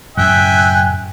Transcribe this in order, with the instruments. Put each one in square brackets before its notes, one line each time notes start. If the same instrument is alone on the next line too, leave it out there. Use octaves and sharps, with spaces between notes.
[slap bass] F#2 A2 C#3 [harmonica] E5 G5 G#5 [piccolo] F#6